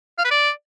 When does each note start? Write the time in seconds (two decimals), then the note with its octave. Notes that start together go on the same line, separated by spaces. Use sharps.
0.18 F5
0.25 B4
0.31 D5